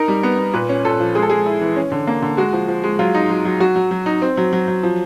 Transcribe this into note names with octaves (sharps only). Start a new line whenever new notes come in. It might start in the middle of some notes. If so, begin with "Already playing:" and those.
Already playing: D#4 A#4
G3
B3
B3
A#2 B4
C#4
A#2 A4
F3
G#3 G#4
A4
G#3 G#4
E4
E3
C#4
D3
A#3
D3
G#3 F#4
F3
F3
G#3
F#3 F4
D#4
F#3
F#3
F#3 F#4
F#3
F#3
D#4
C4
F#3
F#3
F#3
F3